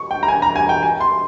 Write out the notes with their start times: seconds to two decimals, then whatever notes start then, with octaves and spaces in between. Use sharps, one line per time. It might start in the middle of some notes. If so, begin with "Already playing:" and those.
Already playing: C#6
0.11 G5
0.23 A#5
0.28 G#5
0.42 A#5
0.56 G#5
0.69 G5
0.83 G#5
1.00 C6